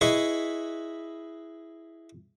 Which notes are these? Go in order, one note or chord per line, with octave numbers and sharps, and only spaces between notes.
E4 G#4 B4 D#5 C#6